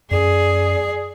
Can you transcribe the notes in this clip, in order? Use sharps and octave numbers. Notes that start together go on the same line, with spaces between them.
F#2 G#4 D5